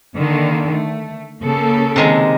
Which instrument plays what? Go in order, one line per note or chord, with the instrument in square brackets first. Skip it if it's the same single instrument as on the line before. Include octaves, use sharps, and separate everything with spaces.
[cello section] D3 D#3 A#3
A3
C#3 A#3 A4
[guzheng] C3 D#3 G#3